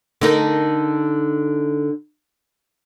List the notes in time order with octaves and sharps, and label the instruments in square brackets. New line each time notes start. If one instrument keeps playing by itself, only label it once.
[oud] D3 D#4 A#4